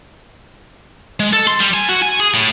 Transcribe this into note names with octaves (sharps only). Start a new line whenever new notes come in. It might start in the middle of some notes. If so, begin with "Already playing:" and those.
G#3
A4
C6
G3
G#5
F#4
G#5
G#4
A2